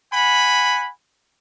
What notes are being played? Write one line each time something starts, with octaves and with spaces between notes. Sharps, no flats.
F#5 G#5 B5